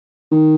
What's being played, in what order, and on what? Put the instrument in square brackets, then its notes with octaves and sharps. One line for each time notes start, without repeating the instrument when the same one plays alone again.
[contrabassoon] D#3